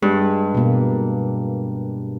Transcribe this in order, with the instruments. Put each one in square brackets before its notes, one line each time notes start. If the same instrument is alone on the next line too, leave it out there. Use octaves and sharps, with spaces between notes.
[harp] G2 [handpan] G#3
[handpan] B2 A#3